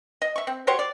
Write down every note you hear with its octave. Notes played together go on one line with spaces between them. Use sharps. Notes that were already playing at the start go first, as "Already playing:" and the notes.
D#5
E5 C#6
C4
F#4 G4 C5 C#5
D5